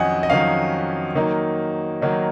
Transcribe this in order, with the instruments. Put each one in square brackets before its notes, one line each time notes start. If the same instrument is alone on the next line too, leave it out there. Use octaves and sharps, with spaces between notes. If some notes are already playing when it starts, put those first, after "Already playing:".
Already playing: [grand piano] F2 D#3 F#3 C#4 D#5 F#5 G#5
D#5
F2 D#3 F#3 C#4 F5
D#3 F#3 A#3 D#4
D#3 F#3 A#3 D#4